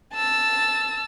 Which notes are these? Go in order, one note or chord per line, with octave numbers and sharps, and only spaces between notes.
A5 E6